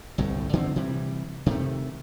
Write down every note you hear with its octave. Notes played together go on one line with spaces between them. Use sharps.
G1 C2 A2
D3 F3 G#3 C4
C3 E3 G3
C3 D#3 A3